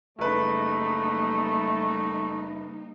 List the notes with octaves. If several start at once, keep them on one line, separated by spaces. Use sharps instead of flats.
F#1 G3 A3 A#3 D#4 B4